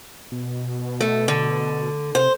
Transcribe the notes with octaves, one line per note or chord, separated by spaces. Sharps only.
B2
A3
D3
C3 C5